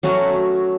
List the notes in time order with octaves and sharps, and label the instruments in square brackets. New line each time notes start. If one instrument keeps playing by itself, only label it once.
[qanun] F#3 A3 C#4 F#4